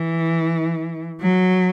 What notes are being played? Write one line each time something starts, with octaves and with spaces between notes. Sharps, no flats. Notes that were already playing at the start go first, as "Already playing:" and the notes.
Already playing: E3
F#3